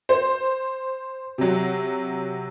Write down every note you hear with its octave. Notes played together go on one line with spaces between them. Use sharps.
C5
C3 F#3